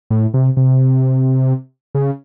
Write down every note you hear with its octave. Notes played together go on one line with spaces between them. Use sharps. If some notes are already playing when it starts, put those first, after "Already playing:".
A2
C3
C3
C#3